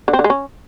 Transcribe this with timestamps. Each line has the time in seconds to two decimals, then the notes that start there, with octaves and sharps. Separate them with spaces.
0.08 D3
0.13 C4
0.19 D3
0.24 G#3
0.30 C#4